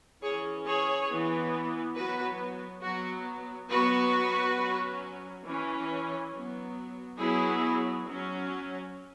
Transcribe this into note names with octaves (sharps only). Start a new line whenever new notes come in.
E3 C#4 G#4 C#5
G#4 C#5
E3 B3
F#3 B3 F#4 B4
F#3 B3 F#4
F#3 B3 F#4 B4
F#3 C#4
E3 C#4
F#3 B3
F#3 B3 E4 G#4
F#3 C#4